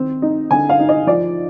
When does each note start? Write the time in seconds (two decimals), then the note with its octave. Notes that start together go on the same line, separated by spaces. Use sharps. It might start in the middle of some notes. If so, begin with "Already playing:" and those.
Already playing: D#3 C4
0.22 D#4
0.51 D3 G#5
0.69 F5
0.79 D#4
0.89 D#5
1.07 F3 D5